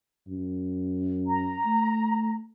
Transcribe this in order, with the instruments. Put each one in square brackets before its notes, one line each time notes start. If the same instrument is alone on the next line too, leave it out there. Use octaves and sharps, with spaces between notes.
[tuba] F#2
[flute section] A#5
[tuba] A3